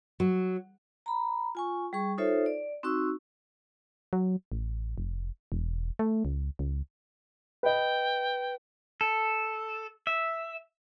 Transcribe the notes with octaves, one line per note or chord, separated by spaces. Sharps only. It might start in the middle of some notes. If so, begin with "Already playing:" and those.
F#3
A#5 B5
F4 G#5 C#6
G3 G#4 C#6
D#4 F4 A4 C5 C#5 E5
D5
C4 D#4 F#4 C#6 E6
F#3
A1
F1
E1
A3
C#2
C#2
B4 D#5 G5
A4
E5